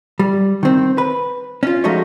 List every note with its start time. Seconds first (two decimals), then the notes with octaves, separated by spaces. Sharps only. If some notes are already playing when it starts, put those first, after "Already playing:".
0.19 G3
0.63 D#3 C4
0.98 B4
1.63 C#4 F4
1.84 F3 G#3 A3 D#4 F#4 C#5